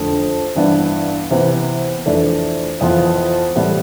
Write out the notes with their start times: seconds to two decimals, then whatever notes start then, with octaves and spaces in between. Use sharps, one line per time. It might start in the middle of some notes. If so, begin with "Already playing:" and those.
Already playing: F2 D3 A3
0.55 G2 E3 B3 D4
1.31 C3 E3 B3
2.06 F2 E3 A3 D4
2.81 F2 E3 B3 F4
3.56 A2 E3 G3 B3